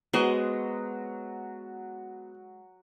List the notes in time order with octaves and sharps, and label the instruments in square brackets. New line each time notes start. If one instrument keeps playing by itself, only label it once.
[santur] F#3 F#4 [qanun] G#3 C5 D#5 [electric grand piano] B3 [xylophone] B4 F#7